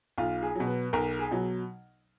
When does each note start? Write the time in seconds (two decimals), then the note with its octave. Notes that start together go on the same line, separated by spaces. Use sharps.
0.18 B1 F4
0.42 G#4
0.55 B2 F#3
0.67 B4
0.93 B1 A#4
1.19 G#4
1.31 B2 F#3